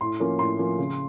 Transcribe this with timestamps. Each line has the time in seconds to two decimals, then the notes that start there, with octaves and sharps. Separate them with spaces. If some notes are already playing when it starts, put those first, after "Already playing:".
0.01 A2 C6
0.20 F3 A#3 C#4
0.39 A2 C6
0.59 F3 A#3 C#4
0.78 C#3